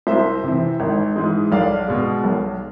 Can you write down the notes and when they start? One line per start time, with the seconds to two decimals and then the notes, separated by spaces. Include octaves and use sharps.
0.07 C2 C5 E5
0.44 C3 E3
0.80 G#1
1.16 G#2 E3 G#3
1.52 B1 D5 F5
1.88 B2 G#3
2.24 B1